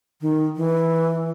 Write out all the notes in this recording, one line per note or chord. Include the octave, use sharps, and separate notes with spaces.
D#3
E3